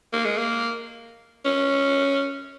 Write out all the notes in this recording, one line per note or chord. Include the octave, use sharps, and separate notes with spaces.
A#3
G#3
A#3
C#4